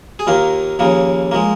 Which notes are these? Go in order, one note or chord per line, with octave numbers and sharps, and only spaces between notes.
G#4
D#2 D#3 A#3 F4
D#2 C#3 F3 A#3
F3 G#3 A#3